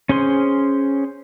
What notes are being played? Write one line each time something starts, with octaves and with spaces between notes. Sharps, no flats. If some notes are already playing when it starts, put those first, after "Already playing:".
C#4 G#4 C5 C6